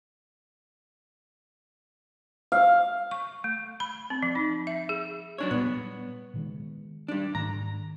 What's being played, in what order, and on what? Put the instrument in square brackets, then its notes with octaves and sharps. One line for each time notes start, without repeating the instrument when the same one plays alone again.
[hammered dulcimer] F5
[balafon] C#6
A3
B5
C4
F3
D#4
E5
G#4
[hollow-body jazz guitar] F#3 D4 C#5
[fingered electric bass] A#2 G3 [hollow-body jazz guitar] B3
[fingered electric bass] A#2 D#3 G#3
[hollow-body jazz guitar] G3 D4
[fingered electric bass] G#2 D#3 A3 [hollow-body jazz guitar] A#5